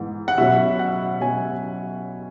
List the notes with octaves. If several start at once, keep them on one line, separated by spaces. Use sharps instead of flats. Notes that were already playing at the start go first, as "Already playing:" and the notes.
Already playing: G#2 E3 B3
F#5
B2 F#3 C#4 E5
F#5
B2 F#3 C#4 G#5